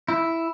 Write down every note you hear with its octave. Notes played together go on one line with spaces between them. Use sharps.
E4